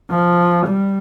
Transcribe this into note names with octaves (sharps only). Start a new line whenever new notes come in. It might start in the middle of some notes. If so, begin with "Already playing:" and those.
F3
G3